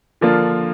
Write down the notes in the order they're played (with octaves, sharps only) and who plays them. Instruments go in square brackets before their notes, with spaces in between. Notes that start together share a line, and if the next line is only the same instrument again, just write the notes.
[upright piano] D3 F3 A#3 D4 F4